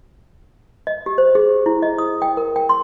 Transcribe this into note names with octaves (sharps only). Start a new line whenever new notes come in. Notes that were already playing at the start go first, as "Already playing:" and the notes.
D#5
G4
C5
G#4
E4
D#5
D#6
G5
A#4
G5
C6